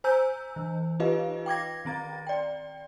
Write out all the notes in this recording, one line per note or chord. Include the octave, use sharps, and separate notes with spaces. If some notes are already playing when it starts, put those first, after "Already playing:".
C5 G#5 A#5 E6 G6
E3
D#4 F4 G4 B4 D#5 F5
G5 D6 G#6 A#6
D#3 C4 A#5 A6
D5 G5